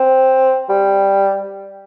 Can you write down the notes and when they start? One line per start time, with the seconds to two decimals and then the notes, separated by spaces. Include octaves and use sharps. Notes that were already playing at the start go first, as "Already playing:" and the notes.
Already playing: C4
0.69 G3